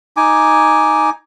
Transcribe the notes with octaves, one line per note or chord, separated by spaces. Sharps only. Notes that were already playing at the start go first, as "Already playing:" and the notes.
D#4 G#5 D6